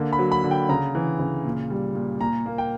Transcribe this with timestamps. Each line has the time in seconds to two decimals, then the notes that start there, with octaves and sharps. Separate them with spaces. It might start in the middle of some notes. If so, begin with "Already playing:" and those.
Already playing: D3 A#3
0.13 B5
0.19 F#3
0.32 B5
0.44 D3
0.51 G5
0.69 C#3 A#5
0.95 E3
1.19 C#3
1.45 A#2
1.70 G3
1.95 A#2
2.21 A#2 A#5
2.46 A#3
2.58 G5